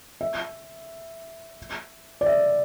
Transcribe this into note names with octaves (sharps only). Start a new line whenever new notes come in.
E5
D5
E5